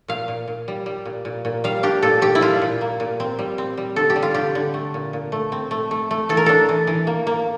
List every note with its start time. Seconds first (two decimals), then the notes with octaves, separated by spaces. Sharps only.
0.08 A#2 F5
0.28 A#2
0.48 A#2
0.68 G3
0.86 G3
1.05 A#2
1.25 A#2
1.45 A#2
1.64 G3 F5
1.83 D4 G4
2.02 A#2 A4
2.22 A#2 G4
2.35 E4
2.41 G3 F4
2.62 A#2
2.81 A#3
3.00 A#2
3.20 C4
3.39 G3
3.58 C4
3.77 G3
3.96 D3 A4
4.10 G4
4.16 G3
4.22 F4
4.34 D3 G4
4.55 D3
4.74 A3
4.94 A#2
5.13 A#2
5.32 A3
5.52 C4
5.71 A3
5.91 A3
6.11 A3
6.29 E3 A4
6.37 A#4
6.46 D4 A4
6.69 E3
6.87 E3
7.07 A#3
7.27 A#3